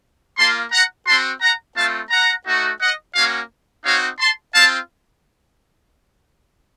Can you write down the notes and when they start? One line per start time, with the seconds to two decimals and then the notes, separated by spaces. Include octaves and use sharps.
0.37 A#3 F4 A5 C6
0.72 F#5 A#5
1.06 C4 F#4 A5 C6
1.41 F#5 A#5
1.75 A3 C4 F4 F5 A5
2.10 F#5 A#5
2.46 A3 D#4 F#4
2.80 D#5 F#5
3.15 A#3 C#4 F#4 C#5 F5
3.84 C4 D#4 F#4 C#5 F5
4.19 A5 C6
4.53 C4 F4 F5 A5